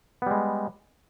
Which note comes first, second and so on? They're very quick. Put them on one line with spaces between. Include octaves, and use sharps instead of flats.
B3 G3 G#3